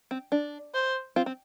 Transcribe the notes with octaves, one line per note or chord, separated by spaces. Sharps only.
C4
D4
C5
C4 F4
C4